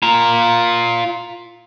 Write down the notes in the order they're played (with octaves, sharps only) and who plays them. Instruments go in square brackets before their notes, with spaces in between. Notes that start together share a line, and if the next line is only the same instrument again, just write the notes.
[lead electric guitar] F4 A#5